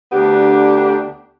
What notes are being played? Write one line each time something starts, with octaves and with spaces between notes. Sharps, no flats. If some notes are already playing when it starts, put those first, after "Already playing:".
D2 D3 B3 D4 G4